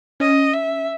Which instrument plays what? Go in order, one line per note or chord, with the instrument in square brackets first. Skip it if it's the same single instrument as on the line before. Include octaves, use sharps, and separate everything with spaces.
[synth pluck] C#4 [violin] D#5
[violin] E5